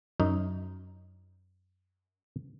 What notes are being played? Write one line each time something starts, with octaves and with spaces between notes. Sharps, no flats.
F#2 D#4